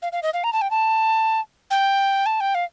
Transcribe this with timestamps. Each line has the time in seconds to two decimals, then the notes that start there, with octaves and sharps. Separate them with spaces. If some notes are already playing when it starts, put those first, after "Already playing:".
0.02 F5
0.12 F5
0.23 D#5
0.34 F5
0.44 A#5
0.53 A5
0.61 G5
0.71 A5
1.71 G5
2.26 A5
2.40 G5
2.55 F5